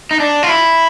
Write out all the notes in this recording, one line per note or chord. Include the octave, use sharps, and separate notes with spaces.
D#4
D4
F4
E4